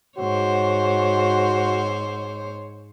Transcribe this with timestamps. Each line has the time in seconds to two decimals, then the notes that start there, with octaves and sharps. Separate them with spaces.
0.18 G#2 F#4 C5 C#5